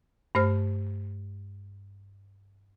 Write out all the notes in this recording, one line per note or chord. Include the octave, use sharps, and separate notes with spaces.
G2 A3 C5 F6